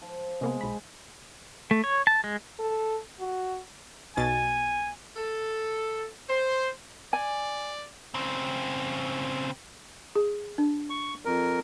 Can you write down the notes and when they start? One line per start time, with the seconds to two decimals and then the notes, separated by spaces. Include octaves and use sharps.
0.02 F3
0.41 C3 G#3 A#3 B3
0.61 B1 B5
1.71 A3
1.84 C#5
2.07 A5
2.24 G#3
2.59 A4
3.20 F#4
4.17 B1 B2 G#5 A6
5.17 A4
6.30 C5
7.13 D5 G#5
8.14 C#3 C4
10.16 G#4
10.58 D4
10.90 C#6
11.25 F2 A#4